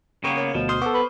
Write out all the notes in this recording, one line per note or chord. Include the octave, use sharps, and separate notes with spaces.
C#3 A#3 B3 G#4 G5 C#6
A#4 C#5
D2 B2 F3
C5 C6 D#6 F6
B3 A4 C#6 D6 E6
B4